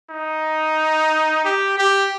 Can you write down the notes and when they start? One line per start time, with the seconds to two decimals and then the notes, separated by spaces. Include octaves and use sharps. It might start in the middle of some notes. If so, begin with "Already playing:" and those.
0.10 D#4
1.45 G4
1.78 G4